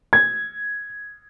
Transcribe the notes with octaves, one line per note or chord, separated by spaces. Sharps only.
G#6